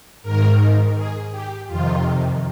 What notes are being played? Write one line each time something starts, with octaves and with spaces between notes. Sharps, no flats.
G#2 D#3 A#4
G#4
G4
F2 C3 D#3 F4